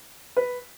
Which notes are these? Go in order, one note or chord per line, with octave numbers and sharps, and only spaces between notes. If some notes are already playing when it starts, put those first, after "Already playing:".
B4